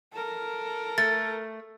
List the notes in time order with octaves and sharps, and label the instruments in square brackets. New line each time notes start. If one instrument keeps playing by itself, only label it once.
[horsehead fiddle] A4 A#4
[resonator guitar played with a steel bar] A3 [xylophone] A6